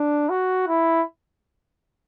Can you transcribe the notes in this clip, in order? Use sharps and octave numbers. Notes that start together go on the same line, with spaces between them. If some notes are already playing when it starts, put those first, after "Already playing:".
Already playing: D4
F#4
E4